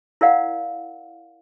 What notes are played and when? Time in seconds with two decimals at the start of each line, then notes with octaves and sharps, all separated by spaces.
0.21 E4 A#4 D5 F5 F#5